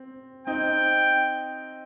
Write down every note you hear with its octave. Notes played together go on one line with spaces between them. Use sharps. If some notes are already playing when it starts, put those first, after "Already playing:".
Already playing: C4
C4 D#4 G5